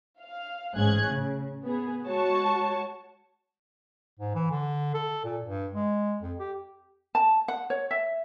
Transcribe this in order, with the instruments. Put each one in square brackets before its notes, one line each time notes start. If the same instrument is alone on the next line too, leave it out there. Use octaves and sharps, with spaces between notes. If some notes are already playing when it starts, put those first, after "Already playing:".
[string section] F5
A1 G#2 C#4 G#4 F#6 G#6
C#3
B3 G#4
G#3 F#4 C#5 A5 C#6
[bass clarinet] G#2
E3
D3
A4
A#2
G2
G#3
F2
G4
[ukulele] A5
F#5
C#5
E5